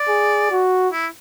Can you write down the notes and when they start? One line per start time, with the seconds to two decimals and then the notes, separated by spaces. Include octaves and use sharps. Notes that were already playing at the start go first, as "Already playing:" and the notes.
Already playing: D5
0.08 G#4
0.51 F#4
0.92 E4